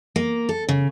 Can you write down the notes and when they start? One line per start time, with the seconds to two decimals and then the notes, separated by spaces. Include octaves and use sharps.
0.16 A#3
0.49 A4
0.69 C#3